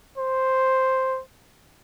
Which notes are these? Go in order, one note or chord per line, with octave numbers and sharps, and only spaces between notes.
C5